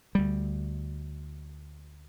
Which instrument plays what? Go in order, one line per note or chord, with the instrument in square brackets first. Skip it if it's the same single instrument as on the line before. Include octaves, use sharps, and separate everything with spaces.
[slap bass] D2 G3